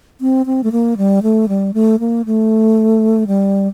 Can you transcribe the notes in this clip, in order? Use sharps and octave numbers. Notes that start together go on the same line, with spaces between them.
C4
C4
A3
A#3
G3
A3
G3
A3
A#3
A3
G3